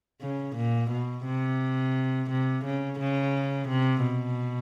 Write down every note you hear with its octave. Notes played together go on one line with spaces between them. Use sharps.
C#3
A#2
B2
C3
C3
C#3
C#3
C3
B2